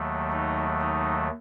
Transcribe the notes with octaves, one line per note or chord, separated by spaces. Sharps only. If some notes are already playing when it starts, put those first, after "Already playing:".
Already playing: D#2 D#3 F#3 A3
D#4
D#4